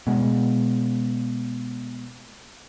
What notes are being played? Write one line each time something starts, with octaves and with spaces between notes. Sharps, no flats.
B2 G#3